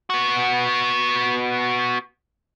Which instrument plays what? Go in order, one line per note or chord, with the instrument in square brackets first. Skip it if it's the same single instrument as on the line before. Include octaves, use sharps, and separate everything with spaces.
[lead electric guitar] B3 F#4